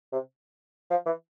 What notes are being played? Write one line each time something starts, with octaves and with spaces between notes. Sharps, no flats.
C3
F3
E3